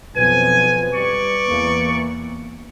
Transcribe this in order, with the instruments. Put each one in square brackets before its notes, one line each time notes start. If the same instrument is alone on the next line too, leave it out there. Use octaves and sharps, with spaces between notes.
[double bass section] B1 F2 F3 [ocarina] B4 [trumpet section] G#5
[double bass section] G3 [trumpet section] D5 C#6
[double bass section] E2 E3 A#3